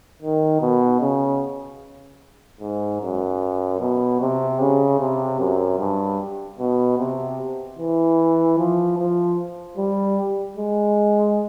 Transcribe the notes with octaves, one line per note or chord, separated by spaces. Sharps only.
D#3
B2
C#3
G#2
F#2
B2
C3
C#3
C3
F#2
G2
B2
C3
E3
F3
F3
G3
G#3